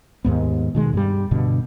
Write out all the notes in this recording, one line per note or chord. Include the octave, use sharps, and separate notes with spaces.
D#2 G#2 B3
B2 D#3 G#3
G2 G3
G2 B2 D3